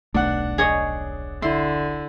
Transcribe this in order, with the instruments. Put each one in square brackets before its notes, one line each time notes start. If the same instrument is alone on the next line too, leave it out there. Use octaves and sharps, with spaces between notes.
[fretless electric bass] D#1 B1 A3 [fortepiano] D4 F#5
[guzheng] G#4 C#5 D#5
[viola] D3 [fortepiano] E4 [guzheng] C6